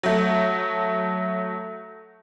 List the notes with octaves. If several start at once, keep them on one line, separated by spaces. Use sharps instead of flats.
F#3 A3